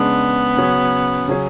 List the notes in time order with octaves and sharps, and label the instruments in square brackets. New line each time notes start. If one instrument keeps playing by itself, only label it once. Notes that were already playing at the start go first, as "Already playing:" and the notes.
Already playing: [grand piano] C#3 G#3 D4 [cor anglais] B3
[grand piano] C#3 F#3 C#4 G#4
C#3 F#3 C#4 G#4